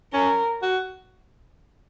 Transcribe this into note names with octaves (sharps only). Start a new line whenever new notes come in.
C#4 A#4
F#4